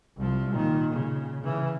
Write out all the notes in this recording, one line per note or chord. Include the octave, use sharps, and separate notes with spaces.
C2 F3
A#2 D#3
C#3
C#3 E3